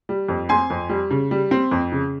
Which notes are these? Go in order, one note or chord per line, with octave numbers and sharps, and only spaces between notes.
G3
F2
C4 G#5 C6
F2
G3
C#3
G3
C4
F2
C#3